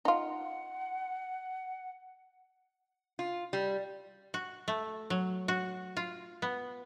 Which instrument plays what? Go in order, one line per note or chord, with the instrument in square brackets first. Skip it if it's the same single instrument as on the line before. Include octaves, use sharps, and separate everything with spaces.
[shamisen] D#4 F4 [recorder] F#5
[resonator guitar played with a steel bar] F4
G3
[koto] F#4
A3
F#3
F#4
F4
B3